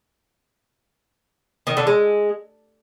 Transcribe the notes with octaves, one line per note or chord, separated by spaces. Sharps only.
D#3
D3
G#3